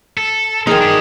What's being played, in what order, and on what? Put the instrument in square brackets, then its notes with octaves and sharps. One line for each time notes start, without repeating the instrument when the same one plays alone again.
[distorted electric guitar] A4
[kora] D#3 D#4 [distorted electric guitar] F3 [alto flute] G#4
[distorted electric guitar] D4 G4